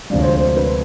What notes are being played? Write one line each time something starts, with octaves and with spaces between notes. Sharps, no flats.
D2 C3 F3 G#3 D5
C#5
C5
C5
C5
B4
C5